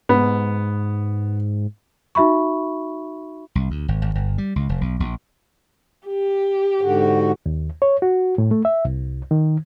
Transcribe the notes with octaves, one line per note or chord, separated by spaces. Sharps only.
G#2 B3
D#4 F#4 E5 B5 C#6
C2
D2
G#1
G#1
G1
G3
C#2
F1
B1
A#1
G4
G#2 D3 F#4
D#2
C#5
F#4
A2
A3
E5
C2
D#3